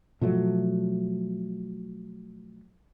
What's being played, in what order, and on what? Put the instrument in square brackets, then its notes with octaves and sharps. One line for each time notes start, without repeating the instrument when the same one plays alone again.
[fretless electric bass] B2 F3 F#3 A3